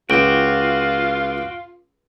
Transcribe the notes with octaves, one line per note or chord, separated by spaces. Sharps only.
C#2 F4 F#4 G5